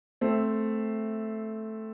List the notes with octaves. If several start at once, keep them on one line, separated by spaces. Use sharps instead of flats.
A3 C4